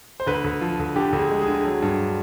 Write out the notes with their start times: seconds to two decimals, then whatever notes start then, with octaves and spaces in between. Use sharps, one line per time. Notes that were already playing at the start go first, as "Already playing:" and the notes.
0.20 C5
0.27 D2 B4
0.44 D2
0.61 F3
0.79 D2
0.96 D3 G4
1.13 D2
1.18 G#4
1.31 G#3
1.42 G#4
1.48 D3
1.65 F#3
1.82 G2